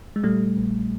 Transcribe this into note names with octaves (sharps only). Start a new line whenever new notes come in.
G#3
A#2 G3 A3
A#1